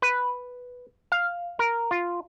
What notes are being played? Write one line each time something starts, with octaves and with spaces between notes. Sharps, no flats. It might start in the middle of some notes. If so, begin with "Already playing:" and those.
B4
F5
A#4
F4